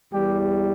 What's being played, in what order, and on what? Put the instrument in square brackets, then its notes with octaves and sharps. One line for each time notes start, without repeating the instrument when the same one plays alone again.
[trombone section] E2 E3 G3 G4